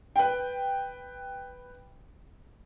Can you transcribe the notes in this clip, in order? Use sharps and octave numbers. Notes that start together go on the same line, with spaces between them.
B4 G5